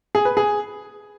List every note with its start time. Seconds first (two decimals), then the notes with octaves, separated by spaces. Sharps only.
0.15 G#4
0.25 B4
0.37 G#4